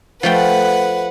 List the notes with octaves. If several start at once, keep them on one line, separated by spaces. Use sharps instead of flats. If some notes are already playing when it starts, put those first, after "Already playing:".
F3 A3 B4 F#5 G5